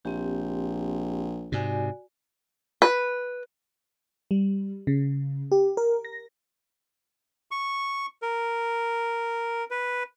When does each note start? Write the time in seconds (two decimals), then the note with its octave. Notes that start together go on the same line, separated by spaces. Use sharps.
0.05 A#1 C4 G4
1.52 G#2 C3 F#4 D5 G#5
2.82 B4
4.31 G3
4.87 C#3
5.52 G4
5.77 A#4
6.05 A#6
7.51 C#6
8.22 A#4
9.71 B4